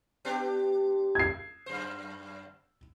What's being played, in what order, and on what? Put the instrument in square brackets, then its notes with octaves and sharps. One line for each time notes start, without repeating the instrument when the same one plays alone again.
[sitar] B3 D4 G4
[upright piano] G#6 C7
[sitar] F#2 C5